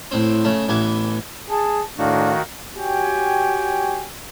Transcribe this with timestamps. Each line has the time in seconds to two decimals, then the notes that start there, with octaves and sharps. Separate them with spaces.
0.11 A2 C4
0.44 C#3 A3
0.69 A1 E3 B3 G#5
1.50 G#4 A5
1.98 A2 D#3 D4 F#4 F5
2.76 F#4 G4 C#5 G5 G#5